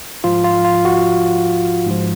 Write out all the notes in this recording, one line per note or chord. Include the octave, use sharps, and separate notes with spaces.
G#2 F3 F4
F4
F4
F#4
G#2 F3